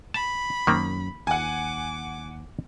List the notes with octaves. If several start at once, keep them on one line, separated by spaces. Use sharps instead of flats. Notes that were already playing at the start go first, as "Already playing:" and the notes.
A5 B5
F#2 D#3 A#3 C4
D#2 F#5 G#5 D6